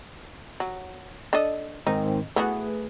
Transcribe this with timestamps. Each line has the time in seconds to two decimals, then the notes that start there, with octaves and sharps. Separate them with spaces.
0.60 F#3
1.33 D4 A4 D#5
1.87 G#2 D#3 C4 D#4
2.36 E3 A3 B3 F#4 G#4 B4